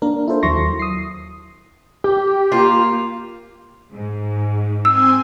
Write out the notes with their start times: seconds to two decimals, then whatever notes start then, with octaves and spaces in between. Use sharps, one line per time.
0.02 A#3 D4 A#4
0.28 E4 F4 A4 C5
0.43 D#2 F#3 E4 C6 C#6 A#6
0.79 D#6 C7
2.04 G4
2.52 A#3 F4
3.92 G#2
4.85 C4 G#5 C6 E6